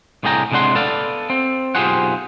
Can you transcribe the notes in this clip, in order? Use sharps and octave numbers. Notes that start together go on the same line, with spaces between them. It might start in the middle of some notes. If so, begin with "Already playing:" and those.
C2 A2 D3 G#4 G5 A#5
A2 C3 G#3 D4 F#5 C6
B3 A4 D5 F5
C4
B1 F4 G4 G#4 C5 F#5